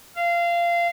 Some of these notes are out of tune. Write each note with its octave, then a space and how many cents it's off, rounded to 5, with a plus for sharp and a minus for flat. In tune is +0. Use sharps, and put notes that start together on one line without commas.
F5 -20